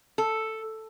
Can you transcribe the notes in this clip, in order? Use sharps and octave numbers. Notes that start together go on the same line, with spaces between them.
A4